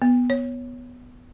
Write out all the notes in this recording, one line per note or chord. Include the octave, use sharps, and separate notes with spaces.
B3
C#5